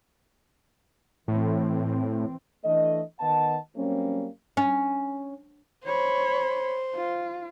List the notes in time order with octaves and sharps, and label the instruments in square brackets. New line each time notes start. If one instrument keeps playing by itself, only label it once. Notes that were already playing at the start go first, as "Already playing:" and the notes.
[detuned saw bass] A2 [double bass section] E3 C4
[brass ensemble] E3 A3 D4 A4 D#5
D#3 B3 D#5 F#5 A5
F#3 G3 A#3 C4 C#4
[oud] C#4
[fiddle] C5 [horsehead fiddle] C#5 B5
[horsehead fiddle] F4